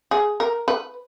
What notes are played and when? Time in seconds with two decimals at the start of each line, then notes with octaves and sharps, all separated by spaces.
0.11 G#4
0.40 A#4
0.68 B4